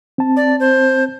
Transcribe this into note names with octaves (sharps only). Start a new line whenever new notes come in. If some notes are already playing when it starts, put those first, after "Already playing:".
C4 A5
D5
C5